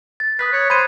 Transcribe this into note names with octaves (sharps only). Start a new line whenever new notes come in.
A6
B4 D#6 F#6 B6
C#5
C5 B5 G#6 D#7